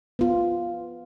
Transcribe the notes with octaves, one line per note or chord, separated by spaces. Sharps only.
B3 F4